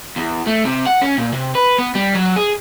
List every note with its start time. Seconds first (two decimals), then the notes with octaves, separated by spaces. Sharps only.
0.17 E2
0.47 A3
0.65 C3
0.86 F#5
1.02 C#4
1.18 A#2
1.33 C3
1.55 B4
1.78 B3
1.95 G3
2.15 F#3
2.36 G#4